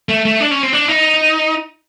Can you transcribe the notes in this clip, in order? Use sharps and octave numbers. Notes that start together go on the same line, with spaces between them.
A3
A3
D4
C#4
C4
D4
D#4